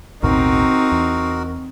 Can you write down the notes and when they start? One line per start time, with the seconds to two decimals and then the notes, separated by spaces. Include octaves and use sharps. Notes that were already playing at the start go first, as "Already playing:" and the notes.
0.23 A1 D#2 B2 C4 D#4 F#4 A#4
0.92 E2